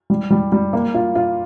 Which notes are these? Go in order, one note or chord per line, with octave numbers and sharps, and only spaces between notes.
G3
G3
G3
A#3
F4
F4